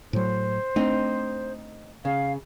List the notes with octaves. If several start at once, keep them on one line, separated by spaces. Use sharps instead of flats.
A2 F#3 C5
A3 C4 D4 D#4
C#3 F5